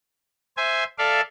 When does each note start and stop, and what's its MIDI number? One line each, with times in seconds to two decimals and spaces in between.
0.57 0.84 72
0.57 0.84 76
0.57 0.84 80
0.98 1.21 69
0.98 1.21 74
0.98 1.21 76
0.98 1.21 77